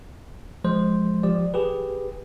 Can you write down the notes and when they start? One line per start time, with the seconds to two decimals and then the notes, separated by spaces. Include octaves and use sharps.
0.64 F3 G#3 C5
1.23 F3 G4 D5
1.54 G4 G#4 B4